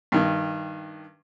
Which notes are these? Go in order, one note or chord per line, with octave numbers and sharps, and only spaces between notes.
G2 D#3